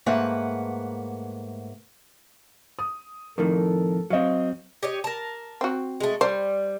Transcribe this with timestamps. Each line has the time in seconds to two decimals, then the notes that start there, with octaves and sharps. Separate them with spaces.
0.06 G#2 A3 A#3 B4 F#5
2.79 D#6
3.38 F2 A2 D#3 A4 A#4
4.10 F#3 C4 D#5 F5
4.83 G4 C#5 D#5
5.04 A#4 A5
5.61 C4 F#4
6.00 G#3 A3
6.21 G3 C5